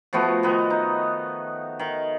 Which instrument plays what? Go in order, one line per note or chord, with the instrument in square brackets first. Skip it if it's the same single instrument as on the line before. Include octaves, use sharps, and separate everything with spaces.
[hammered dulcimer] F3 A3 B3 F#4
D#3 B3
D#4
D#3